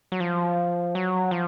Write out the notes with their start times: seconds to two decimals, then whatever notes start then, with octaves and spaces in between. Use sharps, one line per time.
0.12 F#3
0.20 F3
0.95 F#3
1.31 F3